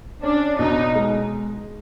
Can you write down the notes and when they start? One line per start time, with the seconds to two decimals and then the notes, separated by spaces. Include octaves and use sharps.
0.23 C#4 D4
0.59 B2 D#4
0.95 G#3